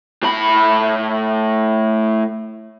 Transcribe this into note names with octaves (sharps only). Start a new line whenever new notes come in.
A2 B5